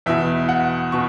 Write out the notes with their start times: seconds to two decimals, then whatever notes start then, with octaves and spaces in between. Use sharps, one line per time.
0.06 E2 B2 E5
0.49 F#5
0.92 B2 C#6